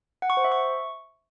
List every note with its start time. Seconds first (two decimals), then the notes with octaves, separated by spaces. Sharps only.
0.22 F#5
0.30 C#6
0.37 C5
0.44 E5
0.52 C#6